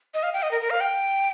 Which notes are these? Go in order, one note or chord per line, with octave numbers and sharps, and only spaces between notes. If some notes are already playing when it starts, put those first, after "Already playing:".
D#5
F5
G5
D#5
A#4
A#4
F5
G5